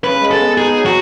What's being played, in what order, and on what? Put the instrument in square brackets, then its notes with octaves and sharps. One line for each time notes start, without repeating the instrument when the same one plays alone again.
[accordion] C#3 [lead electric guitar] B4
[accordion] G#3
[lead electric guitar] A4
[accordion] B3
[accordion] D#4 [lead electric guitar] G#4
[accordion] F#3
[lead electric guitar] F#4